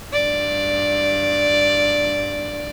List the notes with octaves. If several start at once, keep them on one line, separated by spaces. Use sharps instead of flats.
G2 D5